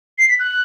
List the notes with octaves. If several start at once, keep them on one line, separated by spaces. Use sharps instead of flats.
C7
B6
F#6